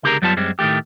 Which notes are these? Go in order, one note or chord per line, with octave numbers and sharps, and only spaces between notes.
C#2 D3 G4 G#4 A#4 A#5
F#2 F#3 G3 B3 F4 A5
F#2 G3 G#3 C4
A2 D#3 E3 A3 G4